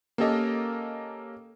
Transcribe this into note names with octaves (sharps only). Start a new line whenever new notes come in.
A#3 C#4 G4 A4 A#4 D#5